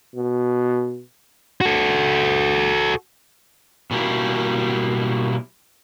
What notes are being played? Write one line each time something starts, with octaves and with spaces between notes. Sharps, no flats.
B2
F#4 A4
B2 G3 A#3 E4